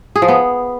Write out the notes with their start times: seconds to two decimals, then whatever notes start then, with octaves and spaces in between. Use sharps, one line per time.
0.16 G#4
0.22 F3
0.28 B3